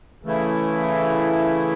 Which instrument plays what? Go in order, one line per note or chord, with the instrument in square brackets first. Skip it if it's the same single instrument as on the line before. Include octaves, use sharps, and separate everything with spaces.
[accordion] C#3 E3 A3 E4